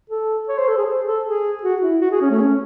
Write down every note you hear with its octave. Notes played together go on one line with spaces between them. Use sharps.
A4
C#5
C5
A4
G#4
C5
A4
G#4
F#4
E4
F#4
G#4
C#4
A3
C#4